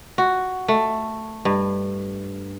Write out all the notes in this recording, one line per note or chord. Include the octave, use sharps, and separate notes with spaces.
F#4
A3
G2